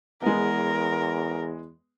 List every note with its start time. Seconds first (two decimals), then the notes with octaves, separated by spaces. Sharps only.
0.22 E2 G#3 B3 A#4